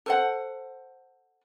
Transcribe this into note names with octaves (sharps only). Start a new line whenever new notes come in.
A4 C5 F#5